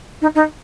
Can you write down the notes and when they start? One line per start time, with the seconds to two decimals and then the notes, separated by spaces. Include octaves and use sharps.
0.21 D#4
0.35 D#4